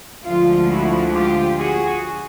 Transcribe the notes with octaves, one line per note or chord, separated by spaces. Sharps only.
D2 D3 F3 G#3 F4
E4 F#4
F4 G4
F#4 G#4